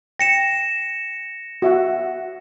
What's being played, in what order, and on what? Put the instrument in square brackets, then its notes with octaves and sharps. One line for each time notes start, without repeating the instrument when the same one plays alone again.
[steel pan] G5 [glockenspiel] A#6 C#7 E7
[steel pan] F#4 E5 F#5